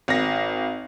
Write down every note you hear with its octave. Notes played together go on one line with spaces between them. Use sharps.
G#1 A#6